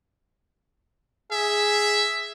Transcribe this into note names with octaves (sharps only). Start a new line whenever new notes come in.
G#4 E5